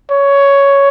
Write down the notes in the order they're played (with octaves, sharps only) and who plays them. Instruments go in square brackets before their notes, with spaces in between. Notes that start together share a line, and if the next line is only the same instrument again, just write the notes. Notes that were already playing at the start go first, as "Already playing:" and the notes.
[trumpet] C#5